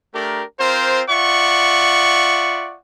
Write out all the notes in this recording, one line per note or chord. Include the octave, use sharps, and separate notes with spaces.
A3 D4 G4 A#4
C4 F4 A#4 C5
F4 D5 E5 F#5 C#6